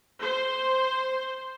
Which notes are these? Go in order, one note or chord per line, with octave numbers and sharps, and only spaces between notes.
C5